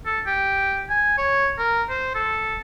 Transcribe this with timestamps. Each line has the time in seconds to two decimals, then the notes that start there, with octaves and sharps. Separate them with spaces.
0.06 A4
0.27 G4
0.90 G#5
1.18 C#5
1.58 A#4
1.89 C5
2.15 A4